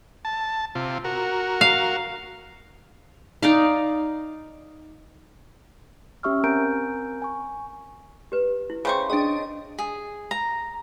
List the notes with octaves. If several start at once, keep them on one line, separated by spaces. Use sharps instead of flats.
A5
C3 F4
F#4 A#4
F5
D#4 D5 F5
C#4 G4 E5 C#6 E6 F6
C4 A#4 G#5 A#5 G6 D7
G#5 C#6
G4 B4
E4
C#3 G#4 C5 E5 G5 C#6
D4 G#4 C#5 D#5 G5
G#4
A#5